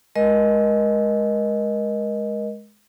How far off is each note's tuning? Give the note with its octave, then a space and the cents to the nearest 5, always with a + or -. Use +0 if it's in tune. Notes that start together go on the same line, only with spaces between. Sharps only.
G#3 +20 A#4 +30 D#5 +0